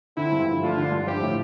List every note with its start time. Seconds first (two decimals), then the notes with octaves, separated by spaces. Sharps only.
0.17 D3 C4 E4
0.32 G2
0.47 F3
0.62 A3 D4 F4
0.78 D3
0.92 G2
1.07 F3 E4 G4
1.22 A2